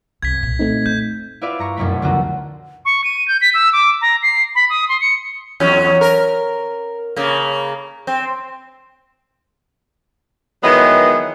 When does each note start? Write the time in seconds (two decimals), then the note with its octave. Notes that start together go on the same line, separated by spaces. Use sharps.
0.22 C2 F#2 G#6 B6
0.43 A#2
0.59 A3 C4 D#4
0.86 F2 G6
1.41 E4 F4 B4 D5 E5 F5
1.59 G2 A#5 C#6
1.76 F1 C2 F#2 B2 A3 B6
2.02 C#2 D3 F4 F#4 A#5
2.85 C#6
3.04 D#7
3.28 G6
3.41 B6
3.54 E6
3.73 D6
4.01 A#5
4.23 C7
4.55 B5
4.70 D#6
4.89 C6
5.01 C#7
5.60 E2 F#3 C#4
6.01 A#4
7.16 C#3 A#3
8.07 C4
10.63 D#3 E3 F#3 G#3 B3